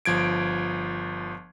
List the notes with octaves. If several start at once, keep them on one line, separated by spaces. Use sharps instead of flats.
G1 F3 G#6 D7